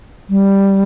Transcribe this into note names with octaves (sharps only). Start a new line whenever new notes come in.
G3